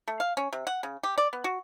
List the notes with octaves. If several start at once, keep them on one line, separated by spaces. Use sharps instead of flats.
A3
F5
C#4
C3
F#5
C#3
G4
D5
B3
F#4